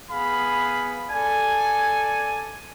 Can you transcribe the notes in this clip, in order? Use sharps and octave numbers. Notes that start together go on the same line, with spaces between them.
B3 G#4 F5 B5
A4 D5 G#5